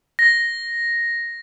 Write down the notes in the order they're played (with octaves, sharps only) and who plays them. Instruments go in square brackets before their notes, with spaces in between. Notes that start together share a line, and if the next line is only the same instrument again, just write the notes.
[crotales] A#6